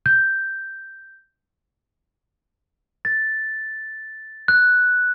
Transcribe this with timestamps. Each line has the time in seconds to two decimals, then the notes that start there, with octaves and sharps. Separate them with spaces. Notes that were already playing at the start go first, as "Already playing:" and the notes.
0.06 G6
3.05 A6
4.48 F#6